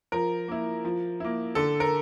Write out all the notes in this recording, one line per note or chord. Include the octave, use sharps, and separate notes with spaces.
F3 A#4
A#3 E4
F3
A#3 E4
D3 A4
A#4